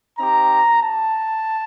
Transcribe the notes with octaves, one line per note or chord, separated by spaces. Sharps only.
C4 D#4 G4 A#5
A5